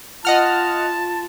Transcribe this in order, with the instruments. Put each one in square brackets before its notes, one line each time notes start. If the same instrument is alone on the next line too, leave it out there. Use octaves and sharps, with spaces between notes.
[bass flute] F4 [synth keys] D#5 F#5 F6 [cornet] A5